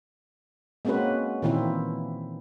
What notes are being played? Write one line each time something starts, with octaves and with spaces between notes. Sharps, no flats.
G#3 A#3 C4 C#4 F#4 B4
A#2 D#3 E3 A#3 C4 E4